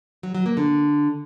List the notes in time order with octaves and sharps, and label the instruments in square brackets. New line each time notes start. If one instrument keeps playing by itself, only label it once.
[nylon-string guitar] F#3
F#3
A#3
D3